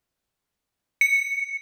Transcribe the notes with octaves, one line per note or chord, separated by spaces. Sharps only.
C#7